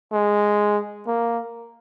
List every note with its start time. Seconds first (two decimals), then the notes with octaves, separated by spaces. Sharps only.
0.13 G#3
1.07 A#3